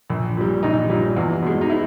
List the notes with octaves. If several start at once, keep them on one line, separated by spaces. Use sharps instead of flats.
A#1
A#2 G3
A#1 D#4
A#2 G3
E2
B2 G#3
D#4
E4